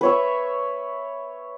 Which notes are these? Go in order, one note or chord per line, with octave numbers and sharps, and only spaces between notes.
B4 C#5 E5